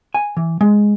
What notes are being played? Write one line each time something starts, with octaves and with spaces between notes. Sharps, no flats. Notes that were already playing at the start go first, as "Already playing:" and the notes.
G#5
E3
G#3